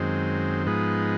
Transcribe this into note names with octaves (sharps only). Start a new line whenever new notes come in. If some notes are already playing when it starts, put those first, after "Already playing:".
Already playing: F#2 D#3 G#3 C4
G#2 F3 G#3 B3 D#4